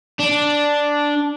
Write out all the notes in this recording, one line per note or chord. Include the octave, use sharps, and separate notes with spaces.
D4